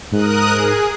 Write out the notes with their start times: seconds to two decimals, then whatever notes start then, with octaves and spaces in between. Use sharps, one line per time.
0.12 G#2 A#4 D#6 F#6
0.52 G#4